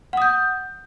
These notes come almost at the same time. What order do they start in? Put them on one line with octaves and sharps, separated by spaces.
F#5 D#6 G6